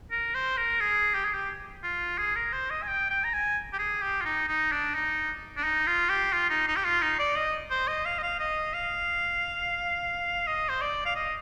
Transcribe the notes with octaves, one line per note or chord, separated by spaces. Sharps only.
A#4
C5
A#4
G#4
G4
G#4
G4
F4
G#4
A#4
C5
D#5
G#5
G5
G5
A#5
G#5
G4
G#4
G4
F4
D#4
D#4
D4
D#4
D4
D#4
F4
G4
F4
D#4
D#4
G4
F4
D#4
D5
D#5
C5
D#5
F5
D#5
F5
D#5
F5
D#5
C5
D5
F5
D#5